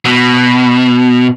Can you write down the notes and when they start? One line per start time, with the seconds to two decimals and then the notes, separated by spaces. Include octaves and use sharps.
0.06 B2